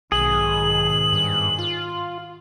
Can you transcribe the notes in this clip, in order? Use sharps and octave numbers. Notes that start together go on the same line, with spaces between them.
B1 G#2 B2 D#3 G#4 F#7
G2
F4